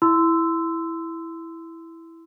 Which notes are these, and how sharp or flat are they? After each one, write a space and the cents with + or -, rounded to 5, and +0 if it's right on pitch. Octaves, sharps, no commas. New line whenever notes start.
E4 +0 C6 -25 E6 +0